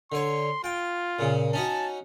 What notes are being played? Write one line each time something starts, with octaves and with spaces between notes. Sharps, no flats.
D3 C#5 C6
F4 G5
A#2 C#3
C#4 D#4 F#4 A5